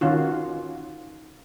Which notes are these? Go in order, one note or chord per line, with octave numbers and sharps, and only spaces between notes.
D#3 C#4 F4 F#4